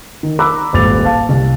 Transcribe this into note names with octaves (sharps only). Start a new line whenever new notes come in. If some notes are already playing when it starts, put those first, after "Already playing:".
D#3
A#5 B5 D6 E6 F#6
D#1 G#1 D6 A6 F7
F5 A5
C2